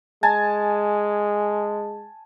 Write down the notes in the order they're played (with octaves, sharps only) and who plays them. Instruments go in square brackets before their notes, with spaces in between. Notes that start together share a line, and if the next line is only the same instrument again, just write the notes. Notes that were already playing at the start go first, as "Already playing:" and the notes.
[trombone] G#3 [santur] G#5 A5